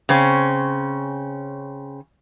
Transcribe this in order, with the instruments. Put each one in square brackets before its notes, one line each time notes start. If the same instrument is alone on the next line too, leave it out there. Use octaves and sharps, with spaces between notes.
[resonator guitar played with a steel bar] C#3 C4 C#4